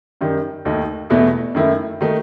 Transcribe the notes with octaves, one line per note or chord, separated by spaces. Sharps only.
F#2 D#3 G3
D#2 D#3 A3 D#4
E2 B2 A3 E4
F#2 D#3 A3 E4
D#3 A3 D#4